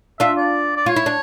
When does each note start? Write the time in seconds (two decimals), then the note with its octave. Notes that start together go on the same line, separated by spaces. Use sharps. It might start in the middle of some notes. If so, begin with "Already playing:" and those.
0.20 D4 F4 E5
0.37 D5
0.76 D5
0.86 F4 C#5
0.96 E4
1.06 D4